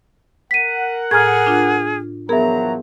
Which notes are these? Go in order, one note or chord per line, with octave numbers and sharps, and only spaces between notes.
A#4 F#5 B6 D#7
A2 G#4 A#5 F6 G#6
D4 F4
E2 F3 F#3 B3 G#4 A#4 E5 A#5